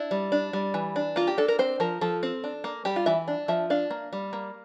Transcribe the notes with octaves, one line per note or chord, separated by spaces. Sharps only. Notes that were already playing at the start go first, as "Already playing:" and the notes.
Already playing: D4 E4
G3
D4
G3
E3
D4
A#3 F4
G4
D4 A4
A#4
C4 C5
F3 A#4
F3 A4
C4
D4
A#3
G3 G4
F4
E3 E5
D4
F3 E5
D4 F5
A#3
G3
A#3